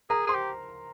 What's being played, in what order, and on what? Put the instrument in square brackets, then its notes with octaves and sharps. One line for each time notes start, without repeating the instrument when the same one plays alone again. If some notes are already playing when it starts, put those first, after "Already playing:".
[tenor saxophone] G#4 [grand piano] A#4 A#5
[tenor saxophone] G#4 [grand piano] C5 C6
[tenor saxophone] G4